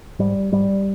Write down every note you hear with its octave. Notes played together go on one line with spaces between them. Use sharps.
G#2 G3
G#2 G3